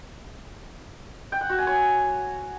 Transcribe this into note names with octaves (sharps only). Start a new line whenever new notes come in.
G5
F#5
F#4
G#5
C#5